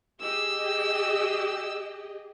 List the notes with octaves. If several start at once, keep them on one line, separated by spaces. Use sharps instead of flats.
G4 G#4 D#5 E6